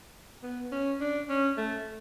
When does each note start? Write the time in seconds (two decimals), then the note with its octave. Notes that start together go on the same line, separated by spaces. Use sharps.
0.43 B3
0.72 C#4
1.01 D4
1.29 C#4
1.58 A3